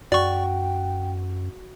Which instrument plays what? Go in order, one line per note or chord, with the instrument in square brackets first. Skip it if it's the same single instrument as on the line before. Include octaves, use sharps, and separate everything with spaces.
[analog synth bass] F#2 [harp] F#4 [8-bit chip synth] D5 C#6 [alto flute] G5